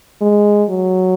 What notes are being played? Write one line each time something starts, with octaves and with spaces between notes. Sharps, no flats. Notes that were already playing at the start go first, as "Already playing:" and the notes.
G#3
F#3